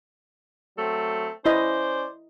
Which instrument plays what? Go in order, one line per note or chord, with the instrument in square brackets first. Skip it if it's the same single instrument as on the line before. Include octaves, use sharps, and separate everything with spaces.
[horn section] F#3 A3 C4
[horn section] C#4 C5 D5 [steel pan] E4 D#5